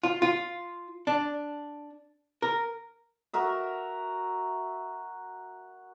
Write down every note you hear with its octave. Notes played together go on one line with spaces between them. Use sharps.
F4
F4
D4
A#4
F#4 A#4 E5